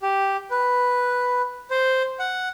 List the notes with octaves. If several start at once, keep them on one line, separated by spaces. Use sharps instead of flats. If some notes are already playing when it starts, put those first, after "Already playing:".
G4
B4
C5
F#5